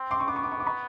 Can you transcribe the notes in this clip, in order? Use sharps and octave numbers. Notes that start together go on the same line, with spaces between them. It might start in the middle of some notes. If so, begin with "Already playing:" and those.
Already playing: C4
C6 D6
C#6
B3 D6
C#6
D6
C#6
D6
B5 C#6